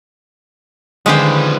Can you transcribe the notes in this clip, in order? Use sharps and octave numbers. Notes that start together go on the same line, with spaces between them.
D3 D#3 F3 G#3 C#4 G4 B4 C5